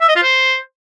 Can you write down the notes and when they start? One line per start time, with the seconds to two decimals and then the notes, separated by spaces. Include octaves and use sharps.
0.01 E5
0.08 D#5
0.15 F4
0.23 C5